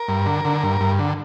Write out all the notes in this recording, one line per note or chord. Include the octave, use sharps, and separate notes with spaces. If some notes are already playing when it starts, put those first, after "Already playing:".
Already playing: A#4
G2
D3
D3
G2
G2
D3